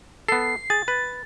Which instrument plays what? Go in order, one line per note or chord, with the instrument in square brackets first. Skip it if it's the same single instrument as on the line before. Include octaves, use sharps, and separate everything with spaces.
[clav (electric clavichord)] B3 A4 [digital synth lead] C7
[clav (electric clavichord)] G#4 [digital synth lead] A6
[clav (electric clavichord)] B4